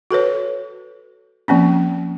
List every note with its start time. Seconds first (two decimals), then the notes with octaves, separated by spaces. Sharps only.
0.11 F#4 A4 B4 C#5
1.48 F3 A#3 C4 C#4